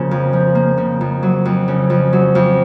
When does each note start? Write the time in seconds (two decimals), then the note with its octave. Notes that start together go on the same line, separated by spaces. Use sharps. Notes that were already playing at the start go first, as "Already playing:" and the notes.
Already playing: C#3 F3 A#3
0.11 F2
0.33 F3
0.55 A#3
0.78 C#3
1.01 F2
1.23 F#3
1.45 F2
1.68 C#3
1.90 F2
2.13 F#3
2.35 F2